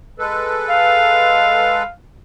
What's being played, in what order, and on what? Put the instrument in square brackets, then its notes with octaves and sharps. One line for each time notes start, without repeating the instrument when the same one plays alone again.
[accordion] G#3 A4 B4
[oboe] F5